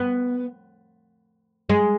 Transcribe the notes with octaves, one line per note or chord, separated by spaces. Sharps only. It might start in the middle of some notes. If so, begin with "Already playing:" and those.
Already playing: B3
G#3